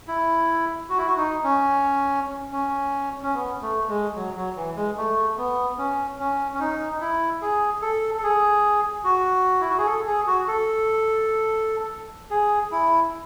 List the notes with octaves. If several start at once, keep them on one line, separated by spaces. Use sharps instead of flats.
E4
F#4
E4
F#4
D#4
C#4
C#4
C#4
B3
A3
G#3
F#3
F#3
E3
G#3
A3
B3
C#4
C#4
C#4
D#4
E4
G#4
A4
A4
G#4
F#4
E4
F#4
G#4
A4
G#4
F#4
A4
G#4
E4